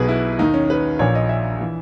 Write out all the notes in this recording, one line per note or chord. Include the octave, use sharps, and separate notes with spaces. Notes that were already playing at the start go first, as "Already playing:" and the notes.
Already playing: B1 B2 G#4 B4
E4
D#2 D#3 D#4
C#4
B4
A#1 A#2 C#5
D#5
E5
E3